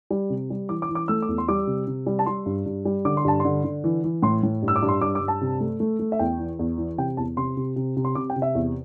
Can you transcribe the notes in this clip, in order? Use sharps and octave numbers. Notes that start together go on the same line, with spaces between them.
G3
C3
G3
E3 D6
D6
E3
D6
A3 E6
D6
E2
C6
G3 D6
C3
C3
G3
A5
G3 C6
G2
G2
G3
D3 D6
C6
G2 A5
D3 C6
D3
E3
E3
A2 C6
A2
G2
E6
D6
G2
C6
G2 D6
D6
G2
A5
C3
A3
A3
A3
E5
E2 G5
E3
E2
E3
C3 G5
E2 A5
C3 C6
C3
C3
C3
C6
C3 D6
G5
C3
E5
E2